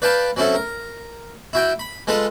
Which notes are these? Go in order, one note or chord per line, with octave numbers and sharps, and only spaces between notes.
B4 D5 F5 G5 A5 B5
F#3 C4 C#4 E4 A4
A#4
E4 F#4 G5
B5
G#3 F4 A4 B4